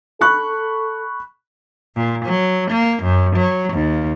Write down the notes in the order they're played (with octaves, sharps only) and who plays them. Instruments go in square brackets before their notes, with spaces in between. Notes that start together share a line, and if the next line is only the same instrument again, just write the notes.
[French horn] A4 [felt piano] B5 C#6 F#6
[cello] A#2
F#3
A#3
F#2
F#3
D#2